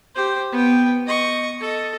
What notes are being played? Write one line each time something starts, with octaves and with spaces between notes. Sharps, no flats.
G4 C5
B3 G5
D#5 C#6
A4 D#5